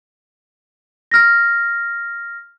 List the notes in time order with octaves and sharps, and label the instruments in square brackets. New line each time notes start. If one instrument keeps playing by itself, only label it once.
[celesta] F6 A#6